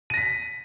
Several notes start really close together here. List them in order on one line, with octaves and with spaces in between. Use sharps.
D#7 A#6 B6